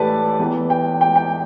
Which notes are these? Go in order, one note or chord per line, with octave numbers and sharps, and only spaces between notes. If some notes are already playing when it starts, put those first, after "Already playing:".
Already playing: A2 E3 G4 A4 B4 D5 A5
E2 E3
G5
G5
G5